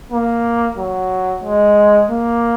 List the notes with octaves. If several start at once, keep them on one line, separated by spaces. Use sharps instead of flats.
A#3
F#3
G#3
A#3